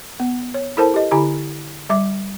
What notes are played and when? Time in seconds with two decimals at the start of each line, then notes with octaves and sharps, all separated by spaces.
0.20 B3
0.54 C#5
0.77 E4 A4 A#4 C5 A5
0.94 G4 D#5
1.11 D3 E4 G4 G#5 A#5 B5
1.89 G3 E5 D6